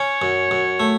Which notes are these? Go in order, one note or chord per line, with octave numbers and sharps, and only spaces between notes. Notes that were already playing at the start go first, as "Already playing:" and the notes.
Already playing: C#4 C#5
F#2
F#2
A3